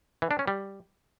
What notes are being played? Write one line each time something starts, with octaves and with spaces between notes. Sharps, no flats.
E3
D4
C#4
G3